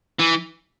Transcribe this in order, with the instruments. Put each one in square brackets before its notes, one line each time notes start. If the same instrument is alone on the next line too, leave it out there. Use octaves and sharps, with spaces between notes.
[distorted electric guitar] E3